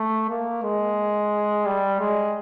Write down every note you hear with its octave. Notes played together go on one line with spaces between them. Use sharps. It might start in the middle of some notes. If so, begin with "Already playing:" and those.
Already playing: A3
A#3
G#3
G3
G#3